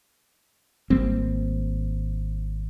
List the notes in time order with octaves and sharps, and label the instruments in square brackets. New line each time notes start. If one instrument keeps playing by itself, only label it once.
[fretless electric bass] G#1 G3 A#3 C4